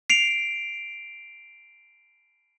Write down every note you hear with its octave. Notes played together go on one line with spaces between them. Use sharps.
C7 D7 F7